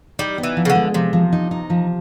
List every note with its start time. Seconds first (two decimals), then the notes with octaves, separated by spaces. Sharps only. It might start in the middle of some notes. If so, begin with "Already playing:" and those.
0.19 G3 D#4
0.38 B3
0.43 E3
0.57 F3
0.65 C#3
0.70 D3
0.75 G#3
0.94 C3 F3
1.13 F3
1.33 D#4
1.51 D#4
1.70 F3